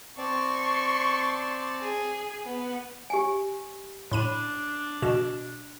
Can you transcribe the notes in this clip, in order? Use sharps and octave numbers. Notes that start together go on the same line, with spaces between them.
C4 D5 A5 C6 C#6
G#4
B3
G4 G#5
A2 D4 B5 D#7
B2 E7